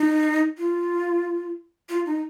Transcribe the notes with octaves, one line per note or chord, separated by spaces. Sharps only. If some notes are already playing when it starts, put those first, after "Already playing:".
Already playing: D#4
F4
F4
D#4